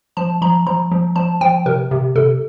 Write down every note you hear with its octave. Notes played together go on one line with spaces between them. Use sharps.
F3 A5
F3 A#5
F3 A#5
F3
F3 A5
F3 G5
C3 A#4
C3
C3 A4